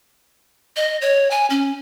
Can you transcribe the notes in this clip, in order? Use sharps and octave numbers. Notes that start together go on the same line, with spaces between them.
D#5
C#5
G#5
C#4